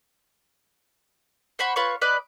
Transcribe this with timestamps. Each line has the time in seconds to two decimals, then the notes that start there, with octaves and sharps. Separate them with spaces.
1.59 C5 F#5 B5 C#6
1.76 F4 B4 C#5 C#6
2.01 B4 D5 D#5 F#6